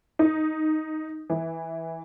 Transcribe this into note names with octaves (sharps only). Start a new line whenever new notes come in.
D#4
E3